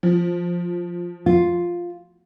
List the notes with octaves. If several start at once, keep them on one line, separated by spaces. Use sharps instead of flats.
F3
F4